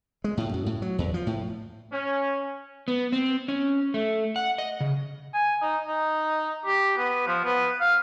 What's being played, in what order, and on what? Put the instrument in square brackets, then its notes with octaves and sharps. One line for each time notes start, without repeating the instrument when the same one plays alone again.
[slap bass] G#3
A2
F#2
A2
F#3
E2
F3
A2
[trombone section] C#4
[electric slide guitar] B3
C4
C#4
A3
F#5
D#5
C#3
[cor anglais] G#5
D#4
D#4
G4
B3
F3
B3
F5